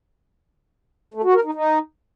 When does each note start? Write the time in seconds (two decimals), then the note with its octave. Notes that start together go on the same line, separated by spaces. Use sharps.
1.14 A3
1.24 F#4
1.34 A#4
1.44 D#4
1.54 D#4